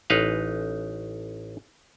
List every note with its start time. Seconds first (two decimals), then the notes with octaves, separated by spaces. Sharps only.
0.10 A1 D#4 B4 F5